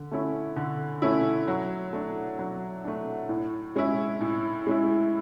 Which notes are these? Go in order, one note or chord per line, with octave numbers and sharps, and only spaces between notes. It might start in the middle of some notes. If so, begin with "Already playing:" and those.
Already playing: D3
A3 C#4 E4
D3
A3 C#4 E4
F#3
A3 D4
F#3
A3 D4
A2
G#3 C#4 E4
A2
G#3 C#4 E4